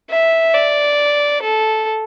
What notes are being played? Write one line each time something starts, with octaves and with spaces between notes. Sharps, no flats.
E5
D5
A4